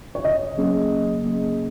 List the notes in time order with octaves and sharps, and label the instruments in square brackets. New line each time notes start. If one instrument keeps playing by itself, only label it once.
[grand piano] C#5
[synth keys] C#3 [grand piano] D#5
[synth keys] F#3 A#3 C#4 G#4
C#3
F#3 A#3 C#4 G#4